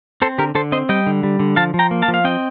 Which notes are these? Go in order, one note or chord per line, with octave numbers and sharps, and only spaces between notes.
C4 A4 C5
D3 G4 A#4
D3 A4 C5
C4 C5 D#5
G3 D#5 G5
D3
G3
D3
F3 F5 A5
F3
G5 A#5
A#3
F5 A5
F3
F5
C4 D#5 G5